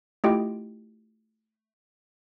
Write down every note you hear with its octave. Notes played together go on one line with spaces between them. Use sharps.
A3 E4 F4 G4 D#5 G5